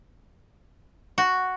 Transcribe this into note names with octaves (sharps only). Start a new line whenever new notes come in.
F#4